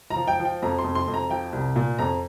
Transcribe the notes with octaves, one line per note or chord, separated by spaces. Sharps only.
A#5
F3
G5
F3
G5
F2 A#5
C6
F2
C6
F2
A#5
F3 G5
C2
A#2
F2 A#5